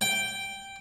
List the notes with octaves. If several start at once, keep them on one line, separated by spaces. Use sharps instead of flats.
G5